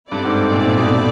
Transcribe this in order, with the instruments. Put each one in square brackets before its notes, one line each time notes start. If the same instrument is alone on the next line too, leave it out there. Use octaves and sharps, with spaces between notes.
[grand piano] G2 [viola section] C4 E4 A4 D5
[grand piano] G#2
A#2
A#2
B2
B2